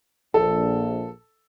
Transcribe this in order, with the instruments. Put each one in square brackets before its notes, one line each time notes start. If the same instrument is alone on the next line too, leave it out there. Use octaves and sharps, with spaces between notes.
[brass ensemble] A#1 [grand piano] A4